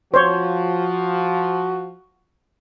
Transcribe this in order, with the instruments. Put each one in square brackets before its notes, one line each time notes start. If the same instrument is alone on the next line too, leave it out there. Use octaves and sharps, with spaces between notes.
[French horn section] F3 [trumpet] F#4 [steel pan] C5 C#5